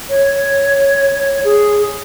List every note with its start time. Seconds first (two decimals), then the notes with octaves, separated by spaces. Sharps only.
0.10 C#5
1.44 G#4